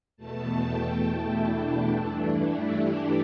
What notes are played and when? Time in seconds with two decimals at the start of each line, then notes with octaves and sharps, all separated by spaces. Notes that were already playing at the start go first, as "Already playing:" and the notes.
0.17 E2 B2 A3 A5
0.60 G5
1.03 E4
1.31 D4
1.59 D4
1.88 G2 E3 A3 D4
2.17 E4
2.44 E4
2.73 G4